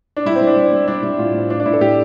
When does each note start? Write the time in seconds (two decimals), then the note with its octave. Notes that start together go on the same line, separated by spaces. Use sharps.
0.17 D4
0.26 G3 E4
0.36 C4
0.41 G3
0.47 D4
0.56 G3
0.73 G3
0.88 G3 D4
1.03 G3 E4
1.18 A2 F4
1.34 A2
1.49 A2 D4
1.60 D4
1.65 A2 E4
1.73 A4
1.80 A2 G4